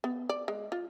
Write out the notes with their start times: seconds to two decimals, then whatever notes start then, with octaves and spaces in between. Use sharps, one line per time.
0.04 B3
0.29 D5
0.48 G#3
0.72 F4